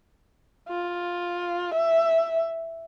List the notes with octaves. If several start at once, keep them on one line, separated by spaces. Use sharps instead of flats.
F4
E5